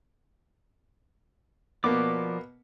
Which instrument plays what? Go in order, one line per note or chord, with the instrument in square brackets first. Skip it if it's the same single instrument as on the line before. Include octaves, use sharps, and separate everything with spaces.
[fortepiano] B2 A#3 B3 [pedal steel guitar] F3 D5 D6